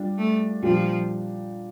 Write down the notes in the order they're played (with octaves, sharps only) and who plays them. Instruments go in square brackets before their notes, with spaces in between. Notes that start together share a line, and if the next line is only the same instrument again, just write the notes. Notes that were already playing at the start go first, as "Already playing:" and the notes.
Already playing: [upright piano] G3 D4 F4
[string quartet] A3
[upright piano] A#2 G3 D4 G4 [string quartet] F3